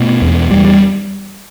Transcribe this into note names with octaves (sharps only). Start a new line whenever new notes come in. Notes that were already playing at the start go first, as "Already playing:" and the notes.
Already playing: B2 A3
E2
E2 G3
G3